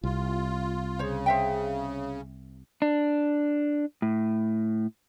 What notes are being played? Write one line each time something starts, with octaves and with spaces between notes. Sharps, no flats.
C2 F4
C#3 C5 C#5
C5 E5 G5
D4
A2